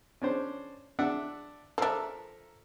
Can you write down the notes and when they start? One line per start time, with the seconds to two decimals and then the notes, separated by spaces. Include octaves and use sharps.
0.22 C#4 D4 C5
0.99 D4 E5 F#5
1.78 F3 D4 A4 A#4 E5